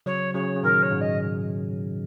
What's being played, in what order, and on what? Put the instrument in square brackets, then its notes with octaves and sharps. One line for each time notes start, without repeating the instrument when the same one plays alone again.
[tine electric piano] C#3 F#3 [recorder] C#5
[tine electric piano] C#3 F#3 [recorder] C#5
[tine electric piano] C#3
[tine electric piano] A#2 D#3 [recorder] A#4
[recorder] C#5
[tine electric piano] G#2 C#3
[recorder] D#5